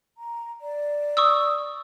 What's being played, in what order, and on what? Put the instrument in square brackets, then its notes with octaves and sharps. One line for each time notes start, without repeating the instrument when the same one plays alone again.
[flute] A#5
D5
[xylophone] C#6 D#6 E6